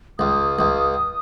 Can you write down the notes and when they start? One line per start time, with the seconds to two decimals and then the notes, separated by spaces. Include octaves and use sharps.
0.19 C#2 D#6
0.59 C#2